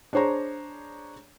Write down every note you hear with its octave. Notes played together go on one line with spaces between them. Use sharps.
D4 G#4 C5 C#5 A#5